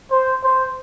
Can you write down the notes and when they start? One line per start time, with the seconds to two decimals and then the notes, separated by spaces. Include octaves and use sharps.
0.10 C5
0.42 C5